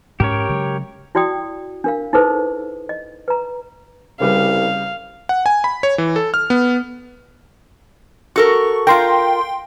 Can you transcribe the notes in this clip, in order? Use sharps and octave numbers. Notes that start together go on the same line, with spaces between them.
G#2 C#4 G4 A#4 C#5
C#3 F#3 G#3
E4 F#4 D5 G5 D#6
D4 A#4 F5
D#4 E4 G#4 A4 B4 C5
D#5
B4 A#5
C2 C#3 G3 B4 F5
F#5
G#5
B5
C#5
E3
A4
F6
B3
F#4 A4 A#4 C#6
F4 A#4 G5 C6